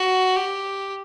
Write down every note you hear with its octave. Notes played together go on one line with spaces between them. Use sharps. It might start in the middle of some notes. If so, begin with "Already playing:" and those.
Already playing: F#4
G4